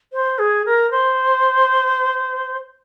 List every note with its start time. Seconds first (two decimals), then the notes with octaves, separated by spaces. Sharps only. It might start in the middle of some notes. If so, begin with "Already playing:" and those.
0.12 C5
0.38 G#4
0.65 A#4
0.90 C5